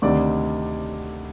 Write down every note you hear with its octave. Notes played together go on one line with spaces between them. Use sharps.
D2 C3 D#3 D5